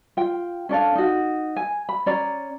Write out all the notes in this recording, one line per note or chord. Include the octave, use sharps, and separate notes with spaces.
F4 G5
C#4 D4 A4 F5
D#4 F#4
G#5
B5
C#4 D5 A#5